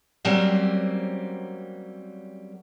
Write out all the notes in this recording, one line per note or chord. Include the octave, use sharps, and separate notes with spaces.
F#3 G3 A#3 C4 C#4